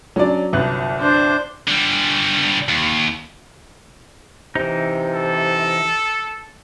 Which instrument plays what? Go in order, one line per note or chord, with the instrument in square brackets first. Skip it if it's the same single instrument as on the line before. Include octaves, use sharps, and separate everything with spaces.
[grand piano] F#3 [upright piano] C#4 D4 D5
[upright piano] G1 C2 F#6
[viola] D4 C5
[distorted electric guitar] D3 G3
D#2
[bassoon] C3 [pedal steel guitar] E3 D#4
[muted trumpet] A4